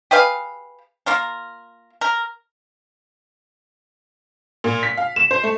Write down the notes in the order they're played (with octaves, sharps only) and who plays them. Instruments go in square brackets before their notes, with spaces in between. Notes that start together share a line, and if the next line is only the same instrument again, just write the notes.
[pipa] G4 G#4 B4 F5
A#3 F4 A#4
A#4
[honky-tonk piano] A#2
B6
F5
E7
C5
A3